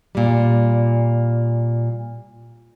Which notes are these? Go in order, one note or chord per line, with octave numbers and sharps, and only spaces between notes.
A#2 G3